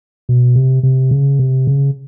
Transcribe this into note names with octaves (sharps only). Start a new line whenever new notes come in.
B2
C3
C3
C#3
C3
C#3